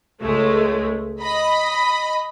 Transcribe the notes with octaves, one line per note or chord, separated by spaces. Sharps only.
C#2 G#3 A3
D#5 B5